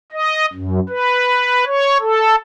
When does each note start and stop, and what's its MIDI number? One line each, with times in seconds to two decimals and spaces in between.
0.12 0.46 75
0.53 0.80 42
0.89 1.64 71
1.66 1.97 73
2.00 2.35 69